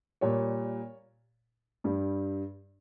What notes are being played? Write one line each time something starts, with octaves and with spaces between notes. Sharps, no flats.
A#2 G3 C#5
G2 G3